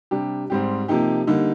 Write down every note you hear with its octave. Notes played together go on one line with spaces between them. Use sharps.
C3 G3 D4 G4
G#2 G3 C4 G4
C3 F3 A#3 D#4 G4
D3 G3 A#3 D#4